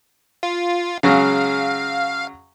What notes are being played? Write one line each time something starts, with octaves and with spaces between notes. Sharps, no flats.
F4
C#3 F#3 G#3 F5